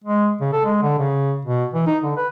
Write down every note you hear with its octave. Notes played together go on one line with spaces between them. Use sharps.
G#3
C#3
A4
G#3
D3
C#3
B2
E3
D#4
D3
B4